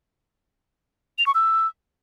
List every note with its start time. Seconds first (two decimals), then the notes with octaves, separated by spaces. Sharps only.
1.18 F7
1.26 C#6
1.34 E6